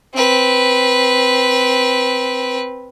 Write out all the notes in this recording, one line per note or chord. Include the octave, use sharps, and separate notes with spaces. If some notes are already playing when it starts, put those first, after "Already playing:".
C4 B4